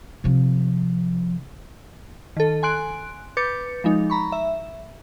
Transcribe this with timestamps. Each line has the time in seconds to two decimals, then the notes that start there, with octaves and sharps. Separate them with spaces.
0.24 C3 F3
2.37 D#3 A4
2.63 G#5 C6 F#6 D7
3.37 B4 D6 G6 A6 C#7
3.84 F3 G#3 D#4
4.10 A#5 B5 C#6
4.32 E5